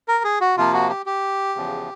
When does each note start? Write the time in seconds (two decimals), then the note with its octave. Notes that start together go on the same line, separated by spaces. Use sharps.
0.08 A#4
0.24 G#4
0.41 F#4
0.57 C3 F3 A#3 F4
0.73 F#4
0.89 G4
1.06 G4
1.55 E2 C#3 F3